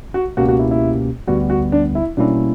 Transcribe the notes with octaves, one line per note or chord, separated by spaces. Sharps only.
F#4
C#2 B2 A#3 C#4 F#4 G4
F#4
E4
E4
D2 D3 G3 B3 F#4
F#4
D4
E4
B2 G3 A#3 C#4 D4 E4